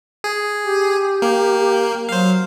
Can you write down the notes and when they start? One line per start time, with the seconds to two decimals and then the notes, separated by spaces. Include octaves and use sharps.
0.24 G#4
0.64 G4
1.22 A#3
2.09 F#3 C5 F5